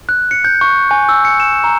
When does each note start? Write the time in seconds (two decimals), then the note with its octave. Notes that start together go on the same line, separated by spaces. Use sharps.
0.09 F#6
0.31 C#7
0.44 G6
0.61 C#6
0.91 G#5
1.09 E6
1.25 C#7
1.40 E7
1.64 A#5